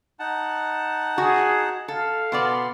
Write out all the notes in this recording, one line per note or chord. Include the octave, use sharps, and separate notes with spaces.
D#4 F#5 A5
F#4 G#4
A4 F5
B2 B3 D5 C6